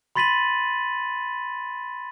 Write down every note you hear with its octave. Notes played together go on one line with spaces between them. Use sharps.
B5 C6 A6 B6 D#7 F#7